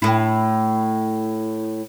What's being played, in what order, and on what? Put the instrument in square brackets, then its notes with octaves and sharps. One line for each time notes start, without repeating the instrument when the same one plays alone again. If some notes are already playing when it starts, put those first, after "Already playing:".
[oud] A2 E4